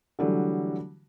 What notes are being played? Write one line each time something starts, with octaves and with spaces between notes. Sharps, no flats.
D3 E3 F#3 G3 A3